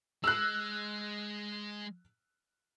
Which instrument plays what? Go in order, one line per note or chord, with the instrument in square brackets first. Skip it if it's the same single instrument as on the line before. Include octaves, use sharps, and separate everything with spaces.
[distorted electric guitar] G#3 [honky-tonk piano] E6 F#6